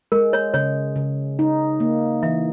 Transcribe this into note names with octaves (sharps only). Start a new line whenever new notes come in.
G#3 A#4
C#5
C#3 C#5
C#3
D#4
A#3
E3 E5